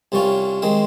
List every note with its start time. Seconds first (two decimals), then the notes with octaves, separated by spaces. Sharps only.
0.12 C2 C3 G3 C#4 F4
0.62 D#3 G#3 C4